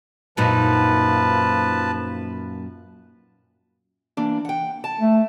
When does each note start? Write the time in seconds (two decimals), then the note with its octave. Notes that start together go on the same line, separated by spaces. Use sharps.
0.37 F#2 A#2 F3 D#4 B4 A5
4.17 E3 A#3 D4
4.45 F#5 G5
4.84 A5
4.99 A3